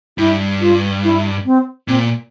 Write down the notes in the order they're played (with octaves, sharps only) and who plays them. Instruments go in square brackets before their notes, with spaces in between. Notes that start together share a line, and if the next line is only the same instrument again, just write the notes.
[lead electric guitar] G2 [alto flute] E4
[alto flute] F4
E4
C4
[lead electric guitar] A#2 [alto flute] C4